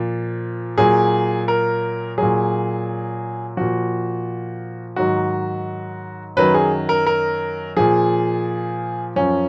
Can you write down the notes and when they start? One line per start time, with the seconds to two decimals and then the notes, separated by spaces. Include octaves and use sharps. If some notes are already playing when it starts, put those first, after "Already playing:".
Already playing: A#2 F3
0.78 A#2 F#3 G#4
1.48 A#4
2.18 A#2 F#3 G#4
3.57 A#2 F3 F#4
4.96 G#2 D#3 F#3 F#4
6.36 F#2 D#3 F#3 B4
6.54 G#4
6.89 A#4
7.06 A#4
7.76 A#2 F3 G#4
9.16 F#2 F3 C#4